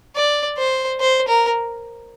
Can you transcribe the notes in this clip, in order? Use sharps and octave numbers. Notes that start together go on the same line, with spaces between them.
D5
C5
C5
A#4